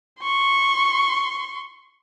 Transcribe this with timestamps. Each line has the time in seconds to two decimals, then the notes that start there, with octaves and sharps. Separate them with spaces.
0.20 C6 C#6